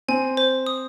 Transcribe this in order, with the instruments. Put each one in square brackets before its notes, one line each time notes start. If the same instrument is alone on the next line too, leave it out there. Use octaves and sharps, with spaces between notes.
[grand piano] C4 [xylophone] G#5
[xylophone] C5
D#6